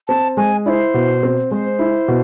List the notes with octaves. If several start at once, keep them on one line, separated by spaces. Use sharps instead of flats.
C4 A5
G#3 G#5
E4 C5 D5
B2
C4
G#3 C5
E4
B2